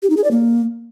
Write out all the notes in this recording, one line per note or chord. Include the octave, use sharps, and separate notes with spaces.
G4
D#4
G#4
D5
A#3